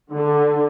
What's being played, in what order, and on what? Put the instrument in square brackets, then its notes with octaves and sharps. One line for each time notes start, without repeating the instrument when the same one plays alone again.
[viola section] D3